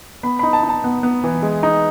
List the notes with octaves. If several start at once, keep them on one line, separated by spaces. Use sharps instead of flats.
B3 B5
D#4 B5
A5
D#4
A5
B3
B3
E3
G#3
D#4